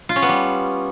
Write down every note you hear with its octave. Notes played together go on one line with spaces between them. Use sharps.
F4
C#4
B3
G3